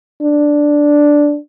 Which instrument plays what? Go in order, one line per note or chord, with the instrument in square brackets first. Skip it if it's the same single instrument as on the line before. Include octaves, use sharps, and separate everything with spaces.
[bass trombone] D4